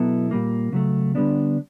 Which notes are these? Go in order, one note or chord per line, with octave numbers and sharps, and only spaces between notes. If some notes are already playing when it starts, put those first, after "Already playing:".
Already playing: B2 F#3 B3 E4 A4
A#2 G3 A#3
C#3 F#3 A3
D3 G3 B3 D4